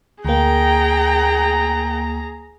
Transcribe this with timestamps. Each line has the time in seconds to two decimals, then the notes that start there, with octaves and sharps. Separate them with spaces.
0.25 D2 A#3 G#4 G5 A#5